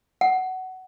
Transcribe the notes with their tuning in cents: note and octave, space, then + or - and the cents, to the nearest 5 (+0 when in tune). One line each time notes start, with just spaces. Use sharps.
F#5 +15